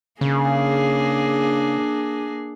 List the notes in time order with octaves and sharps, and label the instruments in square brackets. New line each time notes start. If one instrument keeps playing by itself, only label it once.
[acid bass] C#3 [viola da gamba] A#3 D4 G#4